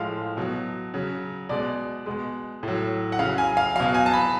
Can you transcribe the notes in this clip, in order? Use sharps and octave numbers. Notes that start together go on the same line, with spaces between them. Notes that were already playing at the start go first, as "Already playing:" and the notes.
Already playing: A2 F3 G#3 F5
B2 F#3
C#3 F#3
B2 G#3 D5
B2 G#3
A2 F#3
F#5
C#3 F#3 F5
G#5
F5
B2 F#3 F5
G#5
A5
B5